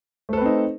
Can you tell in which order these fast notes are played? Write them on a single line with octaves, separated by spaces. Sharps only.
A3 A4 B4 C4 D#4